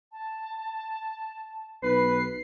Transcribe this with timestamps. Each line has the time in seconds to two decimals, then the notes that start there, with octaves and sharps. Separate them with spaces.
0.12 A5
1.83 B1 B4 C7